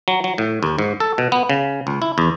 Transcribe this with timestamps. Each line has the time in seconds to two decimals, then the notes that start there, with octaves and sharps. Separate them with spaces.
0.08 F#3
0.24 F#3
0.38 A2
0.63 D#2
0.78 G#2
1.00 A4
1.18 B2
1.32 B3
1.50 C#3
1.87 C#2
2.02 E4
2.18 E2